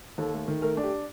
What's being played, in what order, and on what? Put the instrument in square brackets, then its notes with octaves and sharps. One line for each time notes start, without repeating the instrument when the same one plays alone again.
[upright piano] D#2 [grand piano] A4
[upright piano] A3
D#3
[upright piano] A3 [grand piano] A#4
[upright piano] D4
[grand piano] G4